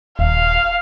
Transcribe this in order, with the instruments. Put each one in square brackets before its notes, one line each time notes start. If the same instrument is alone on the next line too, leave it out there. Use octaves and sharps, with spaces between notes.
[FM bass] D#1 [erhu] F5